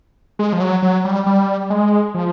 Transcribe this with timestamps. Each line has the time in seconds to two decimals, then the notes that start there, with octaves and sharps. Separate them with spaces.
0.39 G#3
0.53 F3
0.60 F#3
0.82 F#3
1.05 G3
1.26 G3
1.70 G#3
2.14 F3